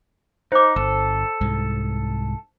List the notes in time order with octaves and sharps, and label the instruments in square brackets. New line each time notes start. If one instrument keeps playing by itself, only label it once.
[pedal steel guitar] D#4 [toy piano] C5 D6
[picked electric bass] G1 [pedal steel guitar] A4
[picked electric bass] C2 G#2